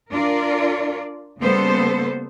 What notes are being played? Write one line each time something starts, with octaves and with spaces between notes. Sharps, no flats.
D4 F4 A#4 D5
C#3 G3 A#3 B3 A4 C5